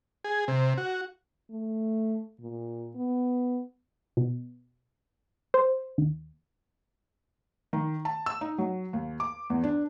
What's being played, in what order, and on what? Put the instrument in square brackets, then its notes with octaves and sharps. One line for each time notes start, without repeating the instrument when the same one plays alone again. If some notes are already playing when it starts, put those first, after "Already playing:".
[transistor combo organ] G#4
C3
F#4
[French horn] A3
A#2
B3
[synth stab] B2
C5
D#2
[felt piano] D#3
A5
E6
D#4
F#3
D#2
D6
E2
D4